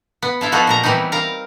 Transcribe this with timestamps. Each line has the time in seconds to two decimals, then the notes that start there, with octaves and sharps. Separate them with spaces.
0.22 B3
0.41 E4 F4 A4
0.52 F3 B3 D#4 F4 F#4 A4
0.67 A#2 A#4 A#5
0.83 E3 G3 B3 C4 D#4
1.12 A#4 F5 A#5